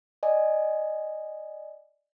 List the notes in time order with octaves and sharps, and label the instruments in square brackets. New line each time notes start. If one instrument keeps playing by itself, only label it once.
[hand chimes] D5 D#5 G#5